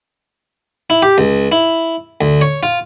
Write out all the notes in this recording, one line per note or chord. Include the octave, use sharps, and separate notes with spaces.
E4
G4
C#2
E4
D2
C#5
F4